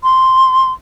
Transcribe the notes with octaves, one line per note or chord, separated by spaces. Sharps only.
C6